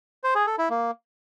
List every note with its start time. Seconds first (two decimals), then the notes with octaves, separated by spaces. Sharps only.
0.24 C5
0.35 G#4
0.47 A4
0.58 E4
0.70 A#3